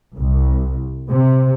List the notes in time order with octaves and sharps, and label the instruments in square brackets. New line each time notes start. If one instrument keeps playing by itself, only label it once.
[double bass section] C2
C3